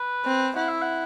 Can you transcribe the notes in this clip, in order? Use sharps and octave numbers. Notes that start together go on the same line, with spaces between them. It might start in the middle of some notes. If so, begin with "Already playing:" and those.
Already playing: B4
C4
E4 F#5
E5
F#5